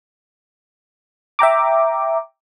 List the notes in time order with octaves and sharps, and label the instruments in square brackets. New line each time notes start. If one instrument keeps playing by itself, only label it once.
[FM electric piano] E5 G5 A#5 D6